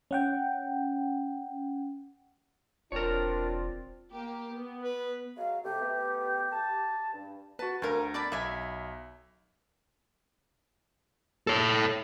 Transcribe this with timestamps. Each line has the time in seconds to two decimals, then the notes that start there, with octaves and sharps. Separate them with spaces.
0.11 C#4 F#5 G5
2.92 E1 C4 D4 F4 A#4 C#5
4.12 A#3 G4
4.55 B3
4.84 B4
5.37 F#3 G#3 F5
5.64 C3 A3 G4
5.80 A3 B3
6.52 A5
7.13 G2
7.59 F#4 B4 A5
7.82 D2 D3 A#4 F5 A#5
8.14 D5 A5 B5
8.32 B1 E5 G#5 B5
11.47 A4 C#5